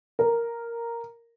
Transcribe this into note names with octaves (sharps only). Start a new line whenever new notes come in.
A#4